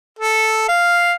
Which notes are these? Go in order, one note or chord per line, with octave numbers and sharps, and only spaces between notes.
A4
F5